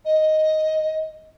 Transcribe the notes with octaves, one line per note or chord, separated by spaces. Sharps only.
D#5